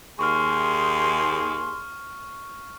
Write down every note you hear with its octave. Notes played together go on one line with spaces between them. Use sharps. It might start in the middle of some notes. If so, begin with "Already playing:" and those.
D#2 G#4 C6 C#6 F6